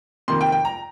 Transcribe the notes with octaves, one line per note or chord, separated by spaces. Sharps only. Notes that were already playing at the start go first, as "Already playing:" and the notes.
F2 C3 D#3 A#3 C6
G5
G5
A#5